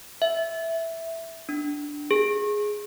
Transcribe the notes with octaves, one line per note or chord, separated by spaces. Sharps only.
E5
D4
G#4